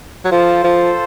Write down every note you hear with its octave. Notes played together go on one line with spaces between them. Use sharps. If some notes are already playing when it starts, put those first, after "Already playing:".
F#3
F3 F4 A4 C5
F3